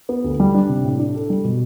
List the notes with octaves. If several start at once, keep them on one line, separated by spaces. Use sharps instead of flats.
B3
D2
G3
D4
C3
A2
D4
A4
G3
B2